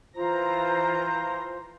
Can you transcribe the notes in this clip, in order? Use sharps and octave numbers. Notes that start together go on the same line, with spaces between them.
E3 F4 C5 A#5